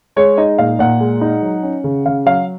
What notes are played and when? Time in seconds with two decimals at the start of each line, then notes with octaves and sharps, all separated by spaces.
0.16 G#3 C#5
0.38 D#4 D#5
0.58 A#2 F5
0.79 A#2 F#5
1.00 G#3
1.21 D#4
1.42 F#3
1.63 C#4
1.84 C#3
2.06 C#3 F5
2.26 F#3 F5